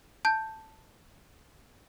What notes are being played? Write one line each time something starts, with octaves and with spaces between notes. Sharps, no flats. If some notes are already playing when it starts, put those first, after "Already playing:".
A5 G6